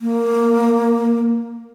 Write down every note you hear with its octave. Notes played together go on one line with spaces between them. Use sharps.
A#3